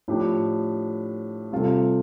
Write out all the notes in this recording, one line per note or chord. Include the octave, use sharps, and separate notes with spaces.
A2 F3 D4 G4
C3 G3 F4 A4